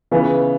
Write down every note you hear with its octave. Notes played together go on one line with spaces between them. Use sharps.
C#3 E3 B3